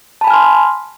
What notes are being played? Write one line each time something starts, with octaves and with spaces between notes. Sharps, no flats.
G#5 A5 B5 C6 F6